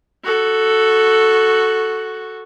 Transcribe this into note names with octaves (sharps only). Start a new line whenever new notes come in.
F#4 A4